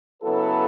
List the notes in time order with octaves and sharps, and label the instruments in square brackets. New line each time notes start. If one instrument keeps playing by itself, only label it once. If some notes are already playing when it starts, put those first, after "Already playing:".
[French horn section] C#3 F#3 B3 E4 A4 [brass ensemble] B4